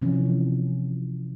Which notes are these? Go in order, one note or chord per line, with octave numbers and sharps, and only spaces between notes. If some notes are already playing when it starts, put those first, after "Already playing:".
C3 E3 F3 C#4